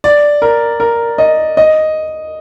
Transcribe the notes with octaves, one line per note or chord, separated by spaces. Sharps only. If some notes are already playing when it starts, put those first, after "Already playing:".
D5
A#4
A#4
D#5
D#5